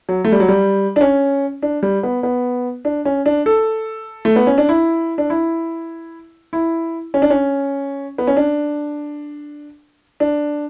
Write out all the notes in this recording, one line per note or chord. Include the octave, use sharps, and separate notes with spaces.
F#3
A3
G3
F#3
G3
D4
C#4
D4
G3
B3
B3
D4
C#4
D4
A4
A3
B3
C#4
D4
E4
D4
E4
E4
C#4
D4
C#4
B3
C#4
D4
D4